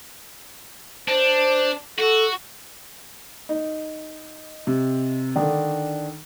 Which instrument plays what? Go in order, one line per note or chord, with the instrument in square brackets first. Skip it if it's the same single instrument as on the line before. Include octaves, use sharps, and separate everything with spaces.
[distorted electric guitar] D4 [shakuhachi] C5
[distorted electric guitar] F#4 [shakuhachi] A4
[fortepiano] D#4
[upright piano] C3
[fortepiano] D3 D#3 [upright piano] D4